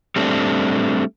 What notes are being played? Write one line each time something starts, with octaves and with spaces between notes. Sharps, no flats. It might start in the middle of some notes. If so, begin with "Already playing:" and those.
G3 A3 C4 D4